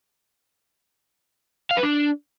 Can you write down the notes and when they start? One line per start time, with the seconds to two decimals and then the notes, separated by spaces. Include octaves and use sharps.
1.71 F5
1.77 B4
1.83 D4